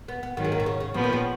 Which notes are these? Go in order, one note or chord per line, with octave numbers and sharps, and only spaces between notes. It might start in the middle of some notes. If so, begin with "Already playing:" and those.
B3
B3
G#2 D#3 F#3 B3
G#3
A#3
B2
C#3
C#3
A#2 C#3 F3 B3
D#3
C#3